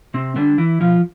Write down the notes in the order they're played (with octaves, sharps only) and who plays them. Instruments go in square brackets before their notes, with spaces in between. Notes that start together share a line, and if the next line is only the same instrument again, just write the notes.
[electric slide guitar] C3 C4
D3 G3 D4
E3 E4
B2 F3 F4